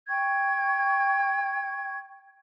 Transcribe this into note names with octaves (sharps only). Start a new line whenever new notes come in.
G5 C#6 G#6